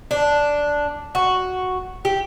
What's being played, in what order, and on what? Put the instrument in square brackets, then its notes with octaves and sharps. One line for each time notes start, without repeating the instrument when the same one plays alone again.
[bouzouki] D4
F#4
G4